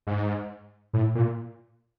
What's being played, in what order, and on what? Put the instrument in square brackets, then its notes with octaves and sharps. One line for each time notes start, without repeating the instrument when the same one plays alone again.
[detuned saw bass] G#2
A2
A#2